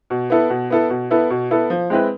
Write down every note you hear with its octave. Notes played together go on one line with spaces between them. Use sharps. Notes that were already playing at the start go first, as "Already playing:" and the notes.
B2
B3 E4 A4
B2
B3 E4 A4
B2
B3 E4 A4
B2
B3 E4 A4
F3
G#3 C4 E4 B4